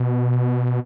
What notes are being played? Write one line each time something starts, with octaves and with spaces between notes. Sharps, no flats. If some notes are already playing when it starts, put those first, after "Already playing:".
Already playing: B2